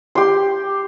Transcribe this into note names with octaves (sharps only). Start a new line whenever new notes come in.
G4 C6